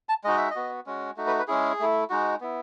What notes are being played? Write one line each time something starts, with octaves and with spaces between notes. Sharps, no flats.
A5
G#3 D#4 F#4 D#5
E5
D#5
B3 F#4
G#3 C#4 F#4
A3 D#4 F#4
B4
B4
G#3 C#4 E4 G#4
A3 E4
G#3 D#4 F#4
B3 E4